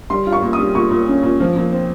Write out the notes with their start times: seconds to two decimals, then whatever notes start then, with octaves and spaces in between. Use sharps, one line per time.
0.10 G3 C6
0.27 F4
0.33 C#6
0.42 A#2
0.53 D#6
0.58 G3
0.75 A#2 C#6
0.91 A#2
1.08 C#4
1.23 A#2
1.40 F3
1.56 A#2
1.72 C4